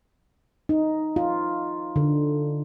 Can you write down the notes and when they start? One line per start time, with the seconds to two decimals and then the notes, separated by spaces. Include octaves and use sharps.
0.69 D#4
1.16 F4
1.96 D3